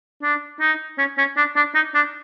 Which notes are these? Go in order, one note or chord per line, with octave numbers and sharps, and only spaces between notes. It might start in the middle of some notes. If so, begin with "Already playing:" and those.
D4
D#4
C#4
C#4
D4
D4
D#4
D4